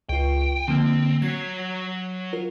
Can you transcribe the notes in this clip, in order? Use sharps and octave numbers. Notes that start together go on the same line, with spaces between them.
C#2 F4 G5
D3 F3 A#3 C4
F#3 F#4 G#6 B6 C7
F4 F#4 A#4